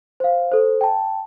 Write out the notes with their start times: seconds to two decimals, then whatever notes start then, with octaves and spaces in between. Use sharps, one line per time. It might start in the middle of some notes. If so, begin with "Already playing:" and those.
0.20 C5 F5
0.52 A4 C5
0.81 G5 A5